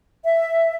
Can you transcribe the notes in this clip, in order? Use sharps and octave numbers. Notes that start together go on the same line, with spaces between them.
E5